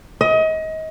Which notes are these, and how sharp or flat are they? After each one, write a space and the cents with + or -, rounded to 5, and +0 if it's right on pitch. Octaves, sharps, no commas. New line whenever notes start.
D#5 +30